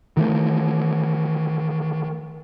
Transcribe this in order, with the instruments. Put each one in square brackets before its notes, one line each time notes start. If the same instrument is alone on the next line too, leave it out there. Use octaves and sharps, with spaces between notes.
[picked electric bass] D#3 E3 G3 A3